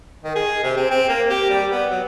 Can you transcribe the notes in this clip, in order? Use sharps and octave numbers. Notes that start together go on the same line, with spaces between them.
D#3
G#4
C3
C4
C4
A#3
G4
G3
B3
F#3